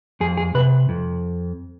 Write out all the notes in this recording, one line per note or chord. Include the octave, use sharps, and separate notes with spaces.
F2 G#4
G#4
C3 B4
F2